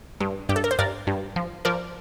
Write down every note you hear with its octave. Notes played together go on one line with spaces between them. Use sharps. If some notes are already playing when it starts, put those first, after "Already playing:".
G2
G2 G4
A4
A#4
C5
G2 A#4 D5
G2
F3
F3 A#4 D5